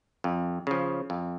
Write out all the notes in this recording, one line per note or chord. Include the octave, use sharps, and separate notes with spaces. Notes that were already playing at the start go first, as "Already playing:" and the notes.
F2
C#3 F3
F2